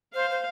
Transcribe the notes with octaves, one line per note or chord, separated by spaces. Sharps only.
C5 F5
C5